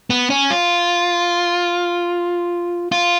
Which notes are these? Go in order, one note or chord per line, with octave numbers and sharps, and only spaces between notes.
B3
C#4
F4
F4